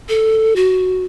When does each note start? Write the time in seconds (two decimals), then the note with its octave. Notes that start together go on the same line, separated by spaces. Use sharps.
0.09 A4
0.56 F#4